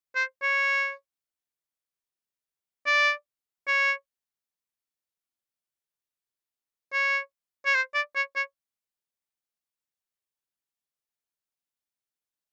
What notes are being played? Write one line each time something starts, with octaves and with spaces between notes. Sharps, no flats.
C5
C#5
D5
C#5
C#5
C#5
C5
D5
C#5
C#5